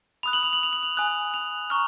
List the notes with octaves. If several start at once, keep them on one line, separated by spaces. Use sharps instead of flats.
B5 D#6 F#6 F7
F#7
F7
F#7
F7
F#7
F7
G#5 D#6 F#6
F7
A#5 C#6 F6